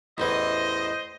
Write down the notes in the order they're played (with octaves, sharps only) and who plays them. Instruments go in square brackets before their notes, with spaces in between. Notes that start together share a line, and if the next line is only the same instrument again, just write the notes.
[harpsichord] A1 E2 E3 [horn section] C5 D#5